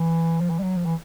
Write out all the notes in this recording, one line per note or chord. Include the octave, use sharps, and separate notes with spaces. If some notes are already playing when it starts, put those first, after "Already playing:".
Already playing: E3
F3
E3
G3
F#3
F3
E3